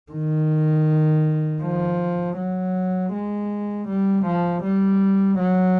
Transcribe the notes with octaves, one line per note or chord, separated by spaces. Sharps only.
D#3
F3
F#3
G#3
G3
F3
G3
F#3